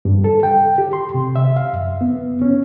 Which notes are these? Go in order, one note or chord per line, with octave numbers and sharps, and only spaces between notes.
G2
A4
G5
G4
C6
C3
E5
F5
F#2
B3
C#4